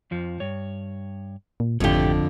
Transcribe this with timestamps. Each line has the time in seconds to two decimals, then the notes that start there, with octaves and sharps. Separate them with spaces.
0.11 F2 F3
0.40 G2 C#5
1.60 A#2
1.80 G#1 F2 A2 D3 A3 G4